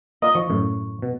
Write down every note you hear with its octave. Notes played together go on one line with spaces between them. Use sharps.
A#3 F4 D#5
F3 C#6
F#2 A2
B2